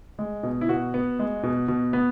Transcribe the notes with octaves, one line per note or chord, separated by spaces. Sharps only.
G#3
B2
E4
B2 F#4
B3
G#3
B2
B2
B3